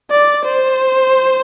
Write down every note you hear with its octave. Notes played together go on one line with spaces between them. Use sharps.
D5
C5